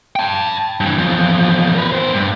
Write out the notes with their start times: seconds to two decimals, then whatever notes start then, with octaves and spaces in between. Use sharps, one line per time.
0.16 G5 A5
0.80 G2 E3
0.98 E2 F3
1.75 A#4 B4
1.92 B3 C5
2.14 G2